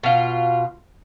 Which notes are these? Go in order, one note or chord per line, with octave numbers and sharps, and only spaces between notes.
B2 F4